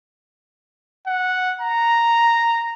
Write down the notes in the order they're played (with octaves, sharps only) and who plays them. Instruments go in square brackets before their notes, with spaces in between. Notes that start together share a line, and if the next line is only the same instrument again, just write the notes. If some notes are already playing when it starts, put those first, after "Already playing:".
[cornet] F#5
A#5